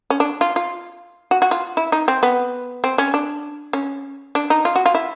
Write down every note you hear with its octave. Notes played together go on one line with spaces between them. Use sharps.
C#4
D4
F4
F4
F#4
F#4
F4
E4
D#4
C4
B3
C4
C#4
D4
C#4
D4
D#4
F4
F#4
F4
E4